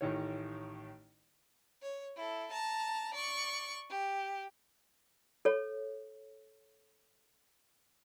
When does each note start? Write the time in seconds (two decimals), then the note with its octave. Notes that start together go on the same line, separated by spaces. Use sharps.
0.01 A1 A2 D#3 C#5
1.82 C#5
2.16 E4 A4
2.51 A5 A#5
3.14 D5 C#6
3.89 G4
5.45 A4 C#5